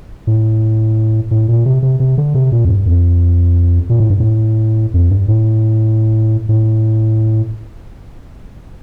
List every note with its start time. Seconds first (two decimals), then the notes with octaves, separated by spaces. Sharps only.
0.27 A2
1.31 A2
1.48 A#2
1.65 C3
1.82 C3
2.00 C3
2.18 D3
2.34 C3
2.52 A#2
2.65 F2
2.69 G2
2.86 F2
3.89 A#2
4.00 A2
4.10 G2
4.20 A2
4.94 F2
5.11 G2
5.28 A2
6.49 A2